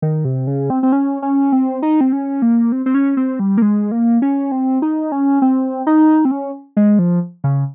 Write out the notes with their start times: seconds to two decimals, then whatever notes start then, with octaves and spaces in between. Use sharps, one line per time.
0.02 D#3
0.25 C3
0.47 C#3
0.70 C4
0.83 C4
0.92 C#4
1.22 C#4
1.52 C4
1.82 D#4
2.01 C4
2.12 C#4
2.42 A#3
2.72 C4
2.86 C4
2.94 C#4
3.17 C4
3.40 G3
3.58 A#3
3.62 G#3
3.92 A#3
4.22 C#4
4.52 C4
4.82 D#4
5.12 C#4
5.42 C4
5.87 D#4
6.25 C4
6.31 C#4
6.77 G#3
6.99 F3
7.44 C#3